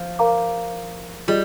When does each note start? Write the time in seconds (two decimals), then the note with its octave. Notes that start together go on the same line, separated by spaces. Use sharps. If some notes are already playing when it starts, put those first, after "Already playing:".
Already playing: F3
0.19 A#4 F5 A#5 D6
1.28 G3 F4 G#4 D#5